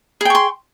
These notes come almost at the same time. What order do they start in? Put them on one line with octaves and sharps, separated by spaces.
G#4 G5 C#6 C6